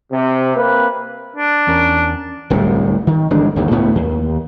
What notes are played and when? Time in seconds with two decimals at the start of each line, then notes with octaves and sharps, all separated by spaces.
0.12 C3
0.56 A#3 C4 B4
1.36 D4
1.67 E2 C#4 A#4
2.50 D1 C2 A2
3.07 D#3
3.31 G1 E3 G#3 D4
3.56 G1 D#2
3.71 C#2 A2 B3
3.95 D#2